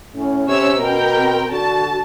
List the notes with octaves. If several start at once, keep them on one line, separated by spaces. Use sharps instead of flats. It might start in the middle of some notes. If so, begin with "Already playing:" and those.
A2 C#4
C3 C#5 E6
B2 A#4 G5
C4
D3 F#4 A5